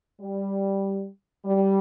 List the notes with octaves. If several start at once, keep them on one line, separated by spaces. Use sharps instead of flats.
G3
G3